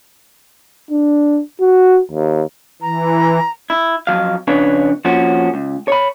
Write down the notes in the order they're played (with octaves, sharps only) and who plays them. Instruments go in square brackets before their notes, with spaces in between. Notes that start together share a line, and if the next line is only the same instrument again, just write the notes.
[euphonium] D4
F#4
D#2
[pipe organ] E3 [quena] A#5
[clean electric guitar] E4
F2 E3 F#3 F5
F2 C#3 D4 B4 C#5 G#5
F3 A#3 C#4 F#4
C#2
C#5 B5